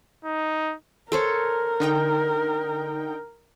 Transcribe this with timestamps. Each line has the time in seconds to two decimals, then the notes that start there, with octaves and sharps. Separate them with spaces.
0.25 D#4
1.12 A4 A#4 C5 C#5
1.80 D3 D#4 G5